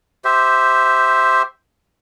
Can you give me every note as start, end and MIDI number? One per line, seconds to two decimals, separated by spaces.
0.25 1.42 67
0.25 1.42 72
0.25 1.42 76